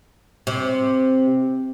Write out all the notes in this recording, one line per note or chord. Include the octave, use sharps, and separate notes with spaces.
C3